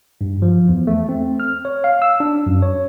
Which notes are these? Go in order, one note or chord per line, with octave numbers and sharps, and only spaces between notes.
G2
F3
E2
A3
C4
F6
C#5
F5
E6
D4
F#2
C#5